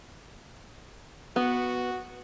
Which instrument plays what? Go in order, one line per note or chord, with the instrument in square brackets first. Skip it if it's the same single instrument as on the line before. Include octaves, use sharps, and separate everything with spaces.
[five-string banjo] B3 [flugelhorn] F#4